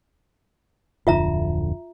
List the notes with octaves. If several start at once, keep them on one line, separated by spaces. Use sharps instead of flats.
D1 F2 D3 F4 E5 A#5